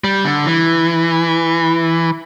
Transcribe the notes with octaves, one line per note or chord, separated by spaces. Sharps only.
G3
D3
E3